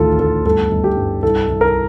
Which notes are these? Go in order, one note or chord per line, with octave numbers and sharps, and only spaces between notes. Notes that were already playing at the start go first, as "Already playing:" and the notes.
Already playing: A1 D2 D#3 F4 A4
D2 A4
G1 A4
G1
G4
G2
C2 A4
C2
A#4